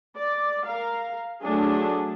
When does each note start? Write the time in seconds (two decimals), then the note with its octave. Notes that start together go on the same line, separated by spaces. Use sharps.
0.15 D5
0.67 A#4 F5
1.42 F#3 A3 D4 G#4